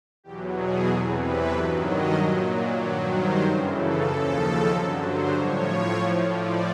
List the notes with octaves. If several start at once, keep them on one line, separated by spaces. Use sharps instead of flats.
E2 B2 F#3 G4
G#4
E2 C3 E3 A4
B4
G2 D#3 F#3 A4
D#5
A#2 F#3
G2 D#3 F#3 D5
C5
F#2 C#3 E3 A#4
A4
D#2 C#3 F3 A4
G2 D3 F#3 A#4
C5
A2 F3 C#5
A2 F3
D5